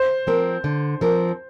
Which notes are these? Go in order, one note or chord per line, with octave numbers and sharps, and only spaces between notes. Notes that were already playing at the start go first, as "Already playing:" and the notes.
Already playing: C5
F3 C4 A#4
D3
F3 C4 A#4